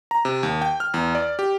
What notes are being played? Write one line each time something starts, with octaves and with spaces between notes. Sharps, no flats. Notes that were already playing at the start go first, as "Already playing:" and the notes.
A#5
C3
D#2
G5
F6
E2
D5
G4